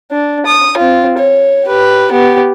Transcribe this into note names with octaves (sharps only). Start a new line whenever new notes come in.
D4
D#6
C4 F4
C#5
G4 B4
B3 G4